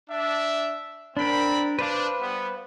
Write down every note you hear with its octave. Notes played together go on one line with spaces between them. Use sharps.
D4 E5
C4 D4 A#4 B5
D4 B4 C5 F5
G3 B3